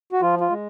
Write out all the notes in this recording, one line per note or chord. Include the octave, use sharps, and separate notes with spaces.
F#4
F3 F4
F4
G#3